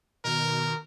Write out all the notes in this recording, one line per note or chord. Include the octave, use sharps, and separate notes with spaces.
B2 D#3 A#4